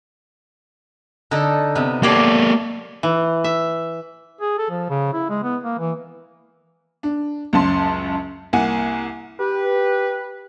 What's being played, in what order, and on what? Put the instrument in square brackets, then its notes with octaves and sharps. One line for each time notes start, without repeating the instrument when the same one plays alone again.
[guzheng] D3 D#4 A4
C3 B3
[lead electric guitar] A#3 A4 [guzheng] G4 C#5 D5
[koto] E3
E5
[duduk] G#4
A4
F3
C#3
E4
G#3
B3
A#3
E3
[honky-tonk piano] D4
C#2 F#2 C#4 A5 C6
C2 A#3 F#5 G#5
[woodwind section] G4 B4